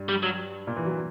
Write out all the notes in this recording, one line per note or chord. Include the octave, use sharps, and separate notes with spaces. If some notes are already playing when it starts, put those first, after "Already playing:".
Already playing: G2
G3
F#3
A#2
E3
F#3